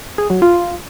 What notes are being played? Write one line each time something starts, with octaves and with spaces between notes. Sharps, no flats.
G#4
F#3
F4